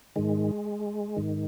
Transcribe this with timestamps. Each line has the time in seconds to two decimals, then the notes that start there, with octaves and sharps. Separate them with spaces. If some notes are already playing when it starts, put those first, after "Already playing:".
0.16 G#2 D#3 G#3
1.16 G#2 D#3